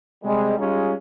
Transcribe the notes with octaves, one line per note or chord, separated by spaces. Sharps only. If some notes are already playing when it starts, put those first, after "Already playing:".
C3 G3 G#3
G3 G#3 C#4 D#4 F4 G#4